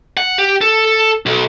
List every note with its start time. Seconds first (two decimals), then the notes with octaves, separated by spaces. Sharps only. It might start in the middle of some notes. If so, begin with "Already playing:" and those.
0.17 F#5
0.38 G4
0.61 A4
1.26 B1